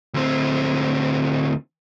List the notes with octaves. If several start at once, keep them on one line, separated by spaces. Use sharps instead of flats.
D2 C4